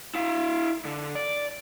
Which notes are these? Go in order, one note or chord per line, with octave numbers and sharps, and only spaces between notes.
E4 F5
D3
D5